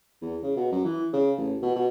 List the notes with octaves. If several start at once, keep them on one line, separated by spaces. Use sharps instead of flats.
E2
C#3
B2
F#2
E3
C#3
A1
B2
B2